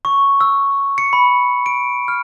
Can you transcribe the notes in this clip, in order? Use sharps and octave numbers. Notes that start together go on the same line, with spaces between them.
C#6
E6
C#7
B5
D7
F6